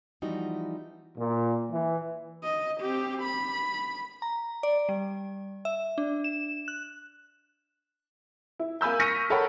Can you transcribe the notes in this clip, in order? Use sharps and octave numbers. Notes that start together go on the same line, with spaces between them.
E3 F3 G3 B3 D#4 F#4
A#2
E3
D#5
C4 G4
B5
A#5
D5
G3
E5
D4
E7
F#6
E4
A#3 G#5 B5 E6 G6
C#6 F6 A#6 B6 C#7 D#7
A4 A#4 C#5 F#5 G5 B5